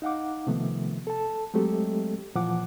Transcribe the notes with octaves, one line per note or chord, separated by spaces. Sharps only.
D#4 F5 F#5 D6
C3 D#3 F3 A3 B3
A4 A5
F#3 G#3 A3 C4 G4 A4
A#2 E3 F3 F#5 D6